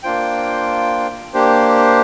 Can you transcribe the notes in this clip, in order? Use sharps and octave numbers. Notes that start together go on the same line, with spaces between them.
A#3 D4 F4 C5 G5
A#3 D4 G4 C5